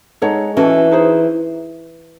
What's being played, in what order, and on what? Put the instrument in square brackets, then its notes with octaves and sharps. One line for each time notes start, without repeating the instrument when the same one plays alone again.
[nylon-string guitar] G#3 [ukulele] D#4 A4 C#5 F#5
[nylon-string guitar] E3 [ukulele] C#4 F#4 A4 D#5
[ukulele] D#4 G#4 C5